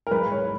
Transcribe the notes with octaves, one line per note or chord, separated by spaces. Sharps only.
A#4
G#2 B4
C#5